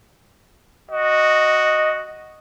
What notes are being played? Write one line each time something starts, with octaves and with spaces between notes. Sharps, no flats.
F#4 D#5